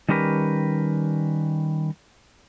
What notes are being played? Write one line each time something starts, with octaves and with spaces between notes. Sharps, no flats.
D#3 G3 C#4 G4 A#4 B4